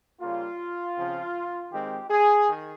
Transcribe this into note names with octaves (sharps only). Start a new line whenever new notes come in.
C#3 G3 A#3 F4
C#3 F3 C4
D#3 G#3 C4 G4
G#4
D#3